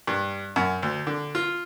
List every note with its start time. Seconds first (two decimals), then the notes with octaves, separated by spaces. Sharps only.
0.07 G2
0.56 F#2
0.83 D2
1.07 D3
1.35 F4